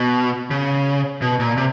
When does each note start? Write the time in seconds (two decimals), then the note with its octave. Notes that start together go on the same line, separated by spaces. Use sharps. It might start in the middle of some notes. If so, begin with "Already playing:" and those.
Already playing: B2
0.51 C#3
1.21 B2
1.39 A#2
1.57 C3